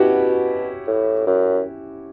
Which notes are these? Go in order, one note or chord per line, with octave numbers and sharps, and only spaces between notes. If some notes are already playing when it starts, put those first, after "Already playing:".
Already playing: B2 C#4 E4 F#4 G4
A2
F#2